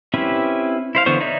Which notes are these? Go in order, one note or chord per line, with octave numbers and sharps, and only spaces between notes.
C4 C#4 E4 G4 B4
E4 C5 F5
D3 E3 B3 C5 C#6
D#4 C#5 D5 E5